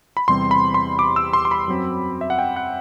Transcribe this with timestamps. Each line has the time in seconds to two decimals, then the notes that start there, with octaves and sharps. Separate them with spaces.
0.17 B5
0.28 E2 C3 G3 C4 C6
0.51 B5
0.74 C6
0.99 D6
1.16 E6
1.33 C6
1.45 C6
1.51 B5
1.68 F#2 F#3 C4
2.21 E5
2.30 F#5
2.39 G5
2.56 F#5